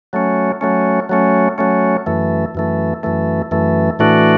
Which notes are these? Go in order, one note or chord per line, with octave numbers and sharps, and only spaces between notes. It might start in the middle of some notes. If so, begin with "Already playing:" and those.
F#3 A3 C#4
F#3 A3 C#4
F#3 A3 C#4
F#3 A3 C#4
F#2 E3 A3
F#2 E3 A3
F#2 E3 A3
F#2 E3 A3
A2 E3 A3 D4 F#4